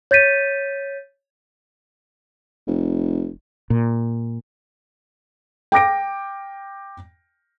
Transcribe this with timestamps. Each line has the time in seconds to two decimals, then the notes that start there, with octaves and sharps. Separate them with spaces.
0.11 C#5 G6 A6 B6 D#7
2.67 F1
3.70 A#2
5.72 G5 D6 A#6 D7